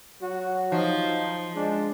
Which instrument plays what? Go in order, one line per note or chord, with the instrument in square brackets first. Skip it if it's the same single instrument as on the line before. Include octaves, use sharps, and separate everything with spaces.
[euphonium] F#3 [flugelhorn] F#4
[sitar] F3 [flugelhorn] D#4
[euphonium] G#3 [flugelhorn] D4